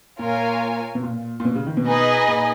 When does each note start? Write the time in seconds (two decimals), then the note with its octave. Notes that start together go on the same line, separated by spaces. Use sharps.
0.19 A#2 F4 A#4 C#5 F5 G#5
0.95 B2
1.03 A#2
1.40 A#2
1.45 B2
1.55 C#3
1.67 D#3
1.77 B2
1.87 D#4 G#4 B4 D#5 G#5
2.28 A#2